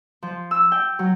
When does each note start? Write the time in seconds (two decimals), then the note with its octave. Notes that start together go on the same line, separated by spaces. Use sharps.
0.23 F3
0.51 E6
0.72 G5
0.99 F#3